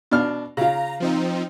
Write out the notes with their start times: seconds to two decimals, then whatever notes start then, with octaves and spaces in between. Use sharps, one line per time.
0.11 B2 D4 F6
0.57 C#3 F4 A#5
1.00 F3 C4 D#4